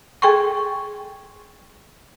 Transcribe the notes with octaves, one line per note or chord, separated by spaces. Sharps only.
G#4 A4 G5 G#5 C6 C#6